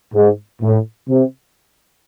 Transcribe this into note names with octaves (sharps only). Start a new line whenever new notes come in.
G#2
A2
C3